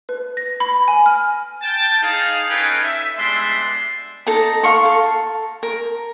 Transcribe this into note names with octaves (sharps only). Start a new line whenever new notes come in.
B4
A#6
B5
G#5
F6
G5 A5
D#4 G#4 F5
C#4 D#4 A4 B4 G5 G#5
E5
G3 G#3 B3 D4 E5 C6
D#4 A4 A#5
F5 C6 C#6
A4
A#4